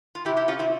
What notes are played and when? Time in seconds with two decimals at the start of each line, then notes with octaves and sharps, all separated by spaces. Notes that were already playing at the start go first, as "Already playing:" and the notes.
0.15 F4
0.25 E3 E4 G4
0.29 C3
0.37 E4 G4
0.48 C#4 F4
0.59 C4 E4